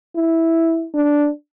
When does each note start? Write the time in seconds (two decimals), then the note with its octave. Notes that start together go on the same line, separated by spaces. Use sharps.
0.16 E4
0.94 D4